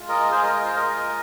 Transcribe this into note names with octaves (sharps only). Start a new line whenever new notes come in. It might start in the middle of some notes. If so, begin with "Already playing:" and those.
Already playing: G#3 F4
A#4 D#5
G#4 C5
A#4 D#5
A#4 D#5
C5 F5
G#3 F4 A#4 D#5